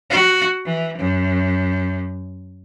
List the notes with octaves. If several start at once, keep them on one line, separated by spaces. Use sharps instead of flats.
F#4
E3
F#2